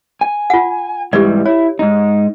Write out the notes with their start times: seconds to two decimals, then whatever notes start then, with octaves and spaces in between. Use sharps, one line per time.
0.21 G#5
0.50 F4 F#5
1.13 G#2 E3 G3 G4 D5
1.46 E4 C#5
1.79 G#2 D#4